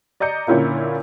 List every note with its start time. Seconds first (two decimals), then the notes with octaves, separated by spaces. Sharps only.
0.20 D5 D#5 A#5 G6 C#7
0.47 A#2 D3 C#4 E4 F4 A#4